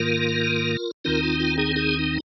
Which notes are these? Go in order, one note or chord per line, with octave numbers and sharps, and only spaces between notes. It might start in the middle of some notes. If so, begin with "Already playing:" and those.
Already playing: G#2 D#3 A#3 F4 A#4
D#2 D#3 C4 D#4 F4 A#4
F4
F4
D#4 G#4
D#4 G#4
D#4